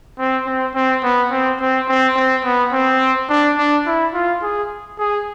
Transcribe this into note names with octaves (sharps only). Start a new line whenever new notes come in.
C4
C4
C4
B3
C4
C4
C4
C4
B3
C4
D4
D4
E4
F4
G#4
G#4